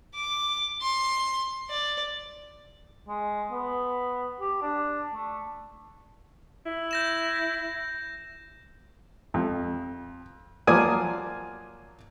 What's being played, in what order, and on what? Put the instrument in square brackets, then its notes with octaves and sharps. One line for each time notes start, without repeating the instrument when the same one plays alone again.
[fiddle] D6
C6
D5
[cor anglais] G#3
B3
G4
D4
A3
[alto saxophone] E4
[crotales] G6 A#6 E7
[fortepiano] F2
F3 F#3 A#3 D5 G#5 D#6